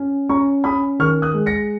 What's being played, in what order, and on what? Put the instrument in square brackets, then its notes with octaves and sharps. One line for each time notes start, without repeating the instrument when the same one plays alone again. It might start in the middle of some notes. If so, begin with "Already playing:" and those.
Already playing: [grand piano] C#4
C#4 A#5 C#6
C#4 B5 D#6
D#3 C#6 F6
D#6 F#6
G#3
A#6 C#7